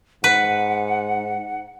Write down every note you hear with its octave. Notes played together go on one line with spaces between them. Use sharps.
G#2 B4 F#5